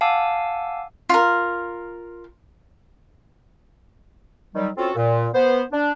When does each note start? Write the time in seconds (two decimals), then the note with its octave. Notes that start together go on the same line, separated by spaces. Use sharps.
0.01 F5 F#5 G#5 A5 D6 E6
1.09 F4 A#4
4.54 D#3 F#3 G3
4.77 C4 C#4 F4 F#4 A4
4.95 A#2
5.34 B3 C5
5.72 D4